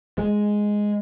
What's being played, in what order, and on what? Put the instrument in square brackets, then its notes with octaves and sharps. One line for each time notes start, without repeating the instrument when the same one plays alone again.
[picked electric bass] G#3